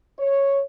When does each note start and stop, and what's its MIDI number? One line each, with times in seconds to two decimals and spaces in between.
0.19 0.63 73